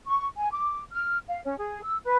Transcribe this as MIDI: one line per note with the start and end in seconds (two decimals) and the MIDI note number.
0.06 0.25 85
0.37 0.50 80
0.52 0.80 86
0.92 1.17 89
1.27 1.39 77
1.44 1.55 61
1.58 1.82 68
1.83 1.97 88
2.04 2.17 71